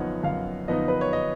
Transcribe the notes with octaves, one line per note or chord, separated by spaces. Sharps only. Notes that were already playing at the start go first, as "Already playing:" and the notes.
Already playing: F#2 F3 B3 D#4 C#5 D#5 F#5
F#2 F5
F3 B3 D#4 D#5
B4
C#5
D#5